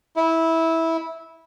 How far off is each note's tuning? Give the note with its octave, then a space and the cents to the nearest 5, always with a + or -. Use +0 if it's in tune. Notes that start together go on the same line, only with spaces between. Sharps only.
E4 -15